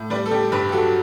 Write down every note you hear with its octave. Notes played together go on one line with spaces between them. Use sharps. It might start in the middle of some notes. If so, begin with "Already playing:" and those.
Already playing: A2
G3 B4 D5
A4
G3 G4
G2 G4 B4
G4
F#3 F#4 A4